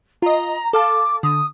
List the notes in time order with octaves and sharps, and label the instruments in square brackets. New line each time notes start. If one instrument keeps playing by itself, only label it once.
[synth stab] F4 D#5 [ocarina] A#5
[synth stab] A4 F5 A5 [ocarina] D6
[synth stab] D3 [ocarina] D#6